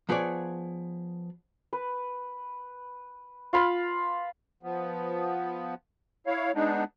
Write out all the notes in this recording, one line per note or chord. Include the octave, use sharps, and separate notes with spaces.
F3 B3 G#4 C#5 D5
B4
F4 F5 B5
F3 B3
E4 C#5 F5
G#3 B3 D4 D#4